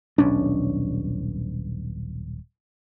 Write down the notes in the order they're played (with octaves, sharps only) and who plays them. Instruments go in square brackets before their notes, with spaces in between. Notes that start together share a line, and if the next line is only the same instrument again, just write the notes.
[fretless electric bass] D#1 B1 C#4 D4